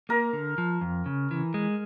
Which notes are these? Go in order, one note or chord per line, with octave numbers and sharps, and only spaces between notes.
A#3 A#4
D3
F3
F2
C#3
E3
G#3